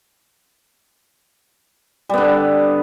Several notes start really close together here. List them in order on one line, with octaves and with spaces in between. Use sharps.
G3 B3 D3